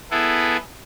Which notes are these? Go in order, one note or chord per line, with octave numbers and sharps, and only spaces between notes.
B3 E4 G#4 A4